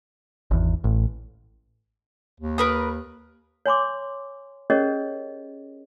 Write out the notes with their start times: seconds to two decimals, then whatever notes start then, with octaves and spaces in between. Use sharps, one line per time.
0.51 G#1 E2
0.84 A1
2.40 D#2
2.58 A#4 B4 D#6
3.66 C#5 G#5 C6 D6
4.70 C#4 G4 G#4 A#4 C#5 D#5